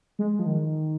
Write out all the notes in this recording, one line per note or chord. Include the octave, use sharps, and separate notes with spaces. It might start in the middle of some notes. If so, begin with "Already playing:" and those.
G#3
F3
D#3